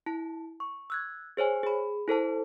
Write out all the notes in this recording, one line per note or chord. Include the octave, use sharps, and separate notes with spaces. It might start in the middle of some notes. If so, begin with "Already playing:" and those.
E4 A5
C#6
E6 F#6 G#6
G#4 C5 C#5 G#5
G#4 B5
E4 A4 C5 A5